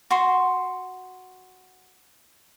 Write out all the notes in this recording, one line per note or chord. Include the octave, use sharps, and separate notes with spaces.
F#4 C6